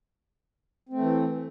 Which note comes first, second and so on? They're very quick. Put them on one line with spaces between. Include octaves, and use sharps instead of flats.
C4 A3 E3